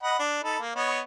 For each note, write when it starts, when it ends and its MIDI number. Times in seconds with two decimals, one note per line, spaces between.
0.03 0.18 75
0.03 0.18 78
0.03 0.18 83
0.19 0.43 62
0.43 0.59 63
0.43 0.59 69
0.43 0.59 83
0.60 0.75 58
0.75 1.00 59
0.75 1.00 73
0.75 1.00 75